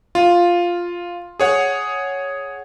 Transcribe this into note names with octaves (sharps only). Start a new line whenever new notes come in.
F4
G#4 C#5 F#5